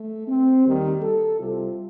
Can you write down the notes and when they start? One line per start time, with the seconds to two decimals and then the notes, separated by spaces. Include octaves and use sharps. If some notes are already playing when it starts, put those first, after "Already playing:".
Already playing: A3
0.28 C4
0.65 D#2 D#3 G3 G4
1.01 A4
1.39 C2 C3 G3 F4